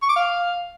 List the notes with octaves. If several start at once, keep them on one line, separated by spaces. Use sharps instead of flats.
C#6
D6
F5